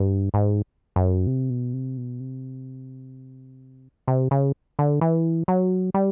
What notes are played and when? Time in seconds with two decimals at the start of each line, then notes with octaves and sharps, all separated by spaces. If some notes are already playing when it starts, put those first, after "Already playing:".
Already playing: G2
0.34 G#2
0.96 F#2
1.27 C3
1.50 B2
1.73 C3
1.97 B2
2.20 C3
4.08 C3
4.31 C#3
4.79 D3
5.01 E3
5.48 F#3
5.94 G3